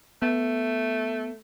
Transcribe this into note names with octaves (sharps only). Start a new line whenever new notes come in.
A3 B3